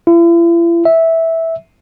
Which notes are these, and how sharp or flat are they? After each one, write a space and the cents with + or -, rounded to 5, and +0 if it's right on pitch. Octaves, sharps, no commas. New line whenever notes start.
E4 +45
E5 -10